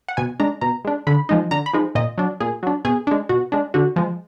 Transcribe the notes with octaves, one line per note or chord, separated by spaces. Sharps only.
F#5
B2 G#5
G#3 D4 A#5
B2 A#5
G#3 D4
D3 B5
F3 G#3 D#4
D3 A#5
B5
F3 G#3 D#4
A#2 D#5
F#3 D4
A#2 G#4
F#3 D4
B2 G#4
G#3 D4
B2 F#4
G#3 D4
D3 F#4
F3 G#3